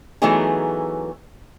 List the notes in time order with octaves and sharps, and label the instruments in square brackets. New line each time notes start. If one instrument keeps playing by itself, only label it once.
[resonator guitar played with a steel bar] E3 F#3 A3 B3 D#4 G#4